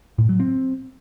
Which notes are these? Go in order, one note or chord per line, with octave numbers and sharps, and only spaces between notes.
A2
F#3
C4